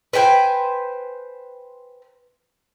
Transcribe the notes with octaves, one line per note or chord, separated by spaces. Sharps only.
B4 C5 G5 G#5